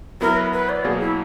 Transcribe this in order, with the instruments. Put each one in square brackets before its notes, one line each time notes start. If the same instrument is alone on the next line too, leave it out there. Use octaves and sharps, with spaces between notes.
[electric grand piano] F#3 B3 E4 [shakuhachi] A#4
[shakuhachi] B4
B4
D5
[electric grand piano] B2 F#3 A#3 [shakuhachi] G#4
[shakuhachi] E4